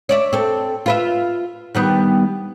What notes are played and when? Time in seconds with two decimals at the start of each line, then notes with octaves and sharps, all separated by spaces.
0.09 C#5 D5 E5
0.33 C4 A4
0.86 F4 B4 E5
1.75 D#3 G3 B3